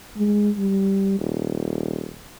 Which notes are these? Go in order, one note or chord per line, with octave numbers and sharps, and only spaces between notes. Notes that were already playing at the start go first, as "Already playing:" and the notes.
G#3
G3
D#1